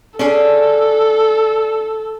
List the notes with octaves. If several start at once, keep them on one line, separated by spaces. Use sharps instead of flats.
C#4 D4 G#4 A4